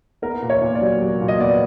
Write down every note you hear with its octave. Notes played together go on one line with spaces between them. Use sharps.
B3 A#4
A#2
C#5
A#2
D5
F#3
F#3
A#2
D#5
B3 D5